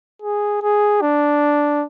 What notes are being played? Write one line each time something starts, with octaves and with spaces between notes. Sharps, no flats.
G#4
G#4
D4